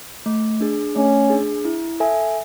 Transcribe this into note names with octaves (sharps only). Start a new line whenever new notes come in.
A3
D4 G#4
A3 C#4
D4 G#4
E4
A4 E5 G#5